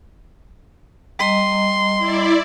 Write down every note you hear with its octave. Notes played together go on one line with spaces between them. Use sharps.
G3 D#5 A#5 C6
E4 D5